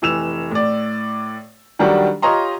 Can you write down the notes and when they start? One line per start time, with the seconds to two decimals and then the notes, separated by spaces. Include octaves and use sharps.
0.02 F1 E3 E6 E7 F7
0.51 A2 D5
1.79 D#3 F#3 G3 D4 F#4 A4
2.22 F4 G4 C#5 D#5 A#5 C6